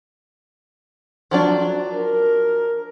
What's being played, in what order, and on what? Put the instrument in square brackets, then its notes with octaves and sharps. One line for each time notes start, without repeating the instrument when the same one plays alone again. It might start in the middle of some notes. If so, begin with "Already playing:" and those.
[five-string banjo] F3 F#3 D4
[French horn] A#4